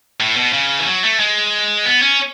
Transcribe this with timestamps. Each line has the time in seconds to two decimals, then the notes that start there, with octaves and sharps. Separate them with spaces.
0.20 A2
0.36 B2
0.53 C#3
0.79 E3
0.86 F#3
1.03 A3
1.19 G#3
1.86 B3
2.02 C#4